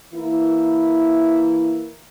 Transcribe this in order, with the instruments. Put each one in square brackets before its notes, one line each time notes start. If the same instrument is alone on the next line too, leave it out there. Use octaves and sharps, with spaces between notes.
[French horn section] E3 A#3 E4